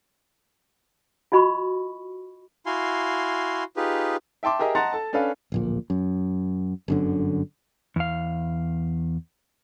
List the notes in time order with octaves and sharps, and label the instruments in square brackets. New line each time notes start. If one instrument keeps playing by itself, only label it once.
[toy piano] F4 F#4 D#5 B5 C#6
[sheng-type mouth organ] E4 F#4 F5 G#5 C6
D#4 F4 G4 G#4 B4
[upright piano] E5 G5 A5 C6 D6
G4 G#4 A#4 D#5 E5
D#5 F#5 A5 A#5 C6 A6
A4 A5
C#4 D4 A4 B4 F5
[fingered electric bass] D1 A#1 A#2
F#2
G1 F#2 D3
[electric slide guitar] E2 F5